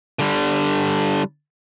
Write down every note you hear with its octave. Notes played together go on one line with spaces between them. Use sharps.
D3 G3